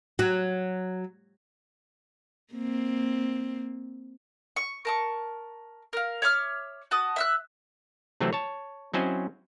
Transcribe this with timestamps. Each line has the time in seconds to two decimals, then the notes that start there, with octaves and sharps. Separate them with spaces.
0.19 F#3
2.54 A#3 C4
4.56 C#6
4.85 A#4 A5 C#6
5.93 A#4 F5
6.22 C#5 E5 D6 F6
6.91 F#4 A5 D#6
7.16 E5 E6 F#6
8.20 C3 E3 F#3 A3 C4
8.33 C#5 A5
8.94 F#3 C4 C#4 E4 C5 D#5